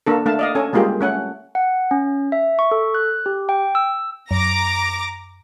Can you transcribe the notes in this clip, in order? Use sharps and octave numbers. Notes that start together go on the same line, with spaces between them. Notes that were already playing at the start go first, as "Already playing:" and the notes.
A#3 D4 A4
A3 D4 F5 A5
D5 D#5 F5
C#4 A4 G#5
G3 G#3 A#3 F4 G4 G#4
A3 C#4 F#5
F#5
C#4
E5
C#6
A4
F#6
G4
G5
E6
F#2 A#5 D6 A#6